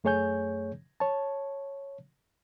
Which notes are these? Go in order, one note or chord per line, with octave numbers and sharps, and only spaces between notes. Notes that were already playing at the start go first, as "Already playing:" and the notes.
F#2 A3 G#4 C#5 G#5 G6
C#5 A5